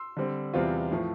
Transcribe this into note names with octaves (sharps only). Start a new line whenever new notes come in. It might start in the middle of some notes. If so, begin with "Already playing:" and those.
Already playing: C6 E6
D3 G3 C4
E2 C3 G3 C4 F4
A2 F3 A3